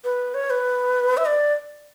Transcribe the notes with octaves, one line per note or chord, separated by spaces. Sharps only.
B4
C#5
B4
E5
D5